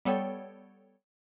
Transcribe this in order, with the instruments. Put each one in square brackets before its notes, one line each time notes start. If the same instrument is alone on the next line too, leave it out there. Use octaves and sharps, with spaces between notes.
[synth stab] G3 B3 A4 C#5 G5